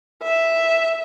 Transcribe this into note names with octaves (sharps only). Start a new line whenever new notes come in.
E5